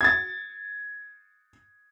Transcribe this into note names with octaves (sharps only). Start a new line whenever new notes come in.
G#6 A6